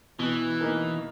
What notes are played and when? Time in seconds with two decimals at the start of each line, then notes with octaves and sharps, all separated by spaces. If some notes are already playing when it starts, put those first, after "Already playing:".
0.19 B2 E3
0.61 A#3 D#4 A#4